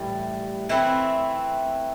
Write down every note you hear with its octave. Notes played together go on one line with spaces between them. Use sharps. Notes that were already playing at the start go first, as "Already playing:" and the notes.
Already playing: A2 E3 G3
E3 A3 C4 E4